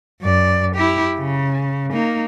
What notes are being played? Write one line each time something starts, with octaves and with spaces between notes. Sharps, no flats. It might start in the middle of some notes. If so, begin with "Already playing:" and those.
F#2 D5
E4 G4
C#3
A#3 D#4